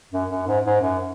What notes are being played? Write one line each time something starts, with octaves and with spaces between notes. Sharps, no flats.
F#2
F#2
G#2
G#2
F#2